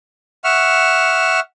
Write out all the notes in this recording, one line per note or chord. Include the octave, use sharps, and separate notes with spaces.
E5 F#5 C#6 F6